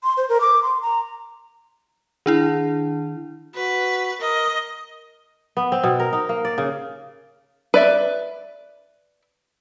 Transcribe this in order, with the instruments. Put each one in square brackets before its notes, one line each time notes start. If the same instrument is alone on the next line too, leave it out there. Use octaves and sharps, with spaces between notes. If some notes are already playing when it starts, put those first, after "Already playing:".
[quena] C6
C5
A#4
D6
C6
A#5
[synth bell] D#3 D4 E4
[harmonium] F#4 [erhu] B4
[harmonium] A#4 [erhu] D#5
[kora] B3
C4
B2
A#4
D#4
A#3
D5
C#3
[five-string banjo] B4 D5 E5